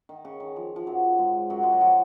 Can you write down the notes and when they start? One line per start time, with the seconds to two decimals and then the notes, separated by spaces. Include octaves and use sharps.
0.09 D#3
0.25 C#3
0.40 D#3
0.56 F3
0.76 F3
0.87 F#2 F#3
1.19 G#2 G#3
1.50 F#2 F#3
1.63 G#3
1.72 F#3
1.81 F3